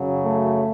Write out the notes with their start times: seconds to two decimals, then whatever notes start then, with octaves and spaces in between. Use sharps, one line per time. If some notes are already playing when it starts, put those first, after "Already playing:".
Already playing: F#2 C#3 F#3
0.23 A3